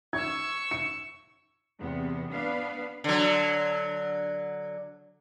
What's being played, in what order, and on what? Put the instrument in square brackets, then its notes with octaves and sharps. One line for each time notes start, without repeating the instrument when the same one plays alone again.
[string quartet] C#6 E6 [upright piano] G#6
[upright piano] C#7
[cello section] E2 C3 B3
B3 D4 B4 F5
[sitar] D3 F#3